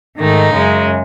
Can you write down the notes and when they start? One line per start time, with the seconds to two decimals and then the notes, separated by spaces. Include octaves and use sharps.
0.18 G#2 D#3 A3 D#4
0.53 F#2 C#3 G#3